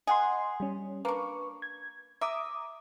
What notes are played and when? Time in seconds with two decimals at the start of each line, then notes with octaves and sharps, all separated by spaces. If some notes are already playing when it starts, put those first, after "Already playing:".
0.07 G#4 D#5 F#5 C6
0.60 G3 C#4
1.05 A#3 D4 B4 C#6
1.62 G#6
2.21 E5 A#5 D6 D#6